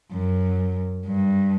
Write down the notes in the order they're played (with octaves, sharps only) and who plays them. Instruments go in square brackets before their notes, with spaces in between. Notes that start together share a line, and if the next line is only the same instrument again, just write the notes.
[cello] F#2
G2